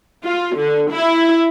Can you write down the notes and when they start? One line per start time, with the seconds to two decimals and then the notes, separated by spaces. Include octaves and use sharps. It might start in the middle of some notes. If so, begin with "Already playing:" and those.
0.24 F4
0.56 D3
0.91 E4